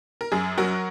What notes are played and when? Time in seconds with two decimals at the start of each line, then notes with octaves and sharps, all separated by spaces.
0.21 A#4
0.32 F#2 G#4
0.58 F#3 F#4 A#4